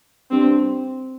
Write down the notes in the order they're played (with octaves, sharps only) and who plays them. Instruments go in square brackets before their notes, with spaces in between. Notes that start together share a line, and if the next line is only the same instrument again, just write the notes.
[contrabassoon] G2 [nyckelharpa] C4